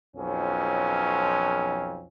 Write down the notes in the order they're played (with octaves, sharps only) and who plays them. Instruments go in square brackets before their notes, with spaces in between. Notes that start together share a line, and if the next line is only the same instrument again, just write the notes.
[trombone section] B1 F2 F3 C#4